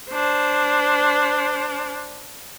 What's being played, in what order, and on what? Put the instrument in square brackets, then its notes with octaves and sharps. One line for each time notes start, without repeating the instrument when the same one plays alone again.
[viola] D4 C5